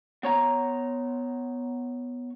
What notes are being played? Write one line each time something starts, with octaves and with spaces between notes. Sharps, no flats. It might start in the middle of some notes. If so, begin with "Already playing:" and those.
B3 C#5 A#5